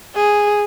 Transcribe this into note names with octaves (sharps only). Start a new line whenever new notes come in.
G#4